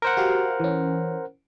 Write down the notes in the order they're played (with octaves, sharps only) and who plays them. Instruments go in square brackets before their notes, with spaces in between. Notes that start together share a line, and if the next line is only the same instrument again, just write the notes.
[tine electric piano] A#4 C5 F#5
[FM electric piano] F#4 G4 F5
E3 C#4